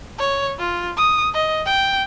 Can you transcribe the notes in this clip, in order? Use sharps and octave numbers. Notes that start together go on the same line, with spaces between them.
C#5
F4
D#6
D#5
G5